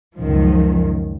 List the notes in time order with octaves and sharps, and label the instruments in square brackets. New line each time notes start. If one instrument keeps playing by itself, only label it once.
[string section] C#2 F#2 D#3 F3